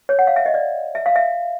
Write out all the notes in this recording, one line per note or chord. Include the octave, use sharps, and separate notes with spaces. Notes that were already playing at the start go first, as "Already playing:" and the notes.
C#5
F#5
F5
E5
D#5
D5
E5
F5
E5